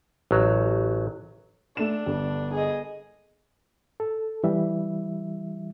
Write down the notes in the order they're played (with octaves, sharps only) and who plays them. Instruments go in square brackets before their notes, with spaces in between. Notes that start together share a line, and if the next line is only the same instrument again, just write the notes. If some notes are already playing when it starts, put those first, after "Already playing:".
[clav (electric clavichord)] A1 F#3
[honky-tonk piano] A3 E7 [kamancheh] D4
[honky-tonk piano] G1
[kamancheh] G#4 D#5
[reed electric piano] A4
E3 G3 E5